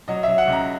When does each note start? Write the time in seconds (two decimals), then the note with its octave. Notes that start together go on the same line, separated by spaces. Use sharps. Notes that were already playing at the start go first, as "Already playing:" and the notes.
0.08 F#3 D#5
0.23 F#3 E5
0.38 F#5
0.48 C#2 A#5